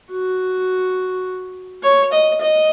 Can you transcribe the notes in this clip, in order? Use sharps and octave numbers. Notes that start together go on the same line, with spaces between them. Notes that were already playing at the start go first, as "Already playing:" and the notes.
F#4
C#5
D#5
D#5